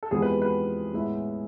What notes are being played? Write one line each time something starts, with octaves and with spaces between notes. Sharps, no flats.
A4
E2 C3 F3 G#3 B3 G#4
B4
B4
A2 G#3 B3 E4